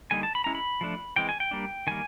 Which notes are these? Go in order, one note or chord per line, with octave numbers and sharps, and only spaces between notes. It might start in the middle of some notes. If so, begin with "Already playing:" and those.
D3 G3 A#3 D#4 G#5
A5
B5
G#3 C#4 E4 A#5
B5
F3 A3 D4
E3 G#3 C4 G5
G#5
G5
G3 A#3 D4
D#3 G3 A#3 G#5